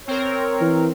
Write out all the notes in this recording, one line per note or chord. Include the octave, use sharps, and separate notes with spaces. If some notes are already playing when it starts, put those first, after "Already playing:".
C4 A#4 C#5
E3